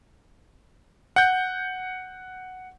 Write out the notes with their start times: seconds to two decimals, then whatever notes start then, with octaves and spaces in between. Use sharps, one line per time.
1.16 F#5 G6